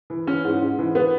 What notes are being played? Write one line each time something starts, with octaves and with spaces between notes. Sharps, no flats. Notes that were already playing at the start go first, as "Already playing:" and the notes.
E3
E3 C#4
G#2
G#2
E3
E3 B3